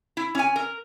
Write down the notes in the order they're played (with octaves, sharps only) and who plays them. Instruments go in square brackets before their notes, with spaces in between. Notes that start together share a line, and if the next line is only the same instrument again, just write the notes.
[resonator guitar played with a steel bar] E4
C#4 G#5
A#4